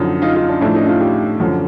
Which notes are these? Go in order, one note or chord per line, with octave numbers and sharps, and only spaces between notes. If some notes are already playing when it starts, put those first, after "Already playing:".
Already playing: F#2 D3 F3 D#4
D#4 F4
D#4 F4
D4
A2 F3 D4 E4
C#4 D#4
D#4 F4
F4 G4
F#2 D3 F3